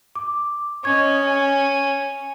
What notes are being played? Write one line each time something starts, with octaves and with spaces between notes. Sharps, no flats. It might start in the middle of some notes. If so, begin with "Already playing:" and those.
D6
C#4 D#5 C#6 G#6
G#5